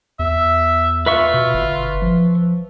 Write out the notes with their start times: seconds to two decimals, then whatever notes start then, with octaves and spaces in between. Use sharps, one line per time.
0.19 E2 E5
1.06 F4 B4 E5 C#6
1.34 B2
1.54 G1
2.02 F3